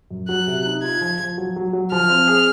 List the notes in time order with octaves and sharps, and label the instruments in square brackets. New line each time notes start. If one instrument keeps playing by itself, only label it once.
[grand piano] F#2
[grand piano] F#3 [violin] F#6
[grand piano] C3
D#4
[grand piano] F4 [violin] G#6
[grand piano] F3
F3
F#3
F#3
F#3
[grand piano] F3 [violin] F6
[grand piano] C4
G#4